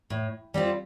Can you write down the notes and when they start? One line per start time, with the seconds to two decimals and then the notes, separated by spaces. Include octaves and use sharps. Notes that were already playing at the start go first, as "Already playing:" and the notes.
0.10 A2
0.54 G3 C4 F4